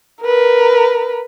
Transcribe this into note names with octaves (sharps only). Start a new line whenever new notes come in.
A#4 B4